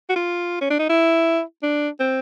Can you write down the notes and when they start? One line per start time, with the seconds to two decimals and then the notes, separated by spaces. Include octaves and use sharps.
0.09 F#4
0.16 F4
0.61 C#4
0.70 D4
0.79 D#4
0.89 E4
1.63 D4
2.00 C4